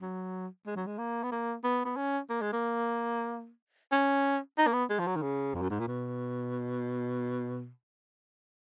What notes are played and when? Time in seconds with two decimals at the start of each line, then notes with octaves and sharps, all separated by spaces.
0.02 F#3
0.66 G#3
0.76 F#3
0.87 G#3
0.98 A#3
1.23 B3
1.32 A#3
1.64 B3
1.85 B3
1.96 C#4
2.30 A#3
2.41 G#3
2.53 A#3
3.92 C#4
4.58 D#4
4.67 A#3
4.73 B3
4.90 G#3
4.99 F3
5.07 F#3
5.16 D#3
5.22 C#3
5.54 F2
5.62 F#2
5.70 G#2
5.80 A#2
5.88 B2